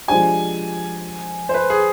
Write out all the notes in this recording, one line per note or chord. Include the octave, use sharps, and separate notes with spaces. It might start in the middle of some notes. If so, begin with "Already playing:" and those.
F3 G#3 D4 G4 C5 G#5
C5
B4
G#4